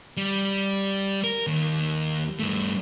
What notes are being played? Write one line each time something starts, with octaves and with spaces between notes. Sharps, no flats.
G3
A#4
D#2
G2 A3